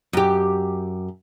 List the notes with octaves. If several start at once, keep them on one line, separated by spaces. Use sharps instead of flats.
F#2 G4